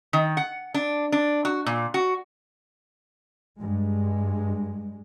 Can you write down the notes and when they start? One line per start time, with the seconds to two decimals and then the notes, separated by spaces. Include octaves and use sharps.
0.13 D#3
0.37 F#5
0.74 D4
1.12 D4
1.45 F#4
1.66 A#2
1.94 F#4
3.59 G2 G#3